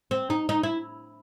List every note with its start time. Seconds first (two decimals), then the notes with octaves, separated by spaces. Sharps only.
0.11 C4
0.30 D#4
0.49 D#4
0.63 E4